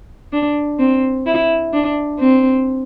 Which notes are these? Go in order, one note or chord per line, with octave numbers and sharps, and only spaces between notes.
D4
C4
E4
D4
C4